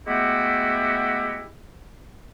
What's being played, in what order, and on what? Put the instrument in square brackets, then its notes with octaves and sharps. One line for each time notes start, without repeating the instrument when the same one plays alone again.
[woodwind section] G#3 A3 B3 E4 F#4 G4